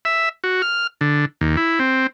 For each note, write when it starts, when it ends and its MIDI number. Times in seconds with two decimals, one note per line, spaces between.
0.05 0.29 76
0.44 0.62 66
0.62 0.87 89
1.01 1.25 50
1.41 1.57 39
1.57 1.79 64
1.79 2.07 60